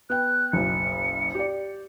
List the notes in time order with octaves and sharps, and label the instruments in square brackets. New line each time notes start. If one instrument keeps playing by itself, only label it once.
[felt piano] B3 G5 [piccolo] F#6
[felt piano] F#1 B1 [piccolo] C#7
[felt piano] G4 D5